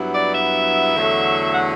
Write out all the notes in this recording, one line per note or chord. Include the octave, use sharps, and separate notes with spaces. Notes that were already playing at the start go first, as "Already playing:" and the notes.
Already playing: G2 F#3 B3 E4
D5
E5
E2 D3 F#3 A3
F#5